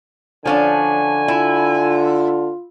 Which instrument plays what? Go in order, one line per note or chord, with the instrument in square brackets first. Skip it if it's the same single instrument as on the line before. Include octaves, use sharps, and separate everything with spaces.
[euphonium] D3 [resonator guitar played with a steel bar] F3 C#4 D4 [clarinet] G#5
[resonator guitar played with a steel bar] E4 [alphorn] F4